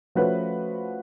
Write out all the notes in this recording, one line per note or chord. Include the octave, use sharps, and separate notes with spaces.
F3 A3 C#4 F#4 B4